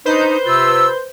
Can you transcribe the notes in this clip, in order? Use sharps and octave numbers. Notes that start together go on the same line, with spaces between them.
D4 D#4 B4 C5 G6
C3 F4 E6